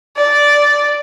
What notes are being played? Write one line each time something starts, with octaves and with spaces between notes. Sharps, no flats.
D5